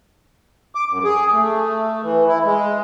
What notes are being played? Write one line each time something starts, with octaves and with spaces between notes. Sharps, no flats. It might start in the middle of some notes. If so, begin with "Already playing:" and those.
D6
F#2
G#4
A3
E3
E4
G#3